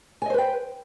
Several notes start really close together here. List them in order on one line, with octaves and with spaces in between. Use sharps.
G#5 D#5 C5 B4 G5